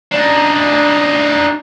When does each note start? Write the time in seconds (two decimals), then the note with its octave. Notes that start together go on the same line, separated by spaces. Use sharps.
0.12 D4 D#4